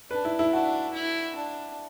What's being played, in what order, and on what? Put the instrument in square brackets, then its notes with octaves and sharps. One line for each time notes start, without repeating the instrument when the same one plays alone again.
[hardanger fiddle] D4 [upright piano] B4
[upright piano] E4
E4
[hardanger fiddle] D4 [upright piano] F#4
[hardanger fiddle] E4
D4